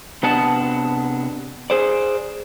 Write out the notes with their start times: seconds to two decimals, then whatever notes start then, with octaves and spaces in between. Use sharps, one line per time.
0.23 C3 B3 D4 D#5 F#5 A5
1.70 G#4 C5 D5